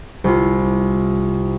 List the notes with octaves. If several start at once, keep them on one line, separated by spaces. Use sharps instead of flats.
C2 F4